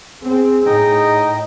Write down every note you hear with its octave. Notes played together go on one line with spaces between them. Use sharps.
C4 G#4
A2 D#4 D#5 G5